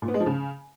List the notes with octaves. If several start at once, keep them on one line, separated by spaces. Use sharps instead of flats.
A#2
B3
G#3
F3
C#3